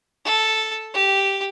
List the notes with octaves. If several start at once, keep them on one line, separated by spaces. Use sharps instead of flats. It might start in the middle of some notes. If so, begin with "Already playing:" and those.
A4
G4